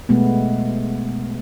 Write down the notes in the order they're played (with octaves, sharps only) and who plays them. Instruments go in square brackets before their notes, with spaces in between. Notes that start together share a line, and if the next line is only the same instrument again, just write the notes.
[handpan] B2 G#3 A3 B3